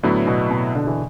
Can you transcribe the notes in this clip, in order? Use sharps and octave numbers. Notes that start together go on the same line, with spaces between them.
A2 D3 F#3 B3 E4
B2
B2
D3
E3